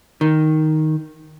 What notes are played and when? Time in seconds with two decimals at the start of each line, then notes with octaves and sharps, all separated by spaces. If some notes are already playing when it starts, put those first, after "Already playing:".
0.21 D#3